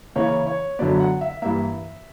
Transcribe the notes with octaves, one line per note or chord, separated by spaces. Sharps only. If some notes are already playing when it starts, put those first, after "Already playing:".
C#3 E3 A#3 C#5
C#5
F#2 D3 F#3 B3 D5
F#5
E5
G2 E3 A#3 E5